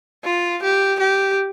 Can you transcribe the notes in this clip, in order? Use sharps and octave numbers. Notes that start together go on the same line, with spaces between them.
F4
G4
G4